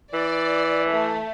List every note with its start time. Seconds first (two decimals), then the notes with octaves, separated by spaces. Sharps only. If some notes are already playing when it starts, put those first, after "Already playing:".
0.13 E3 D5
0.88 A3